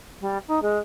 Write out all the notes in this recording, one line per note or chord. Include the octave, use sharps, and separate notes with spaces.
G3
D#4
G#3